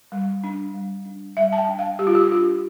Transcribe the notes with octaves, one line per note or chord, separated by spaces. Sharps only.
G3
D4
G3
D4
G3 E5
A5
G5
D4
F5
G3 G4
F4
G4
D4 F4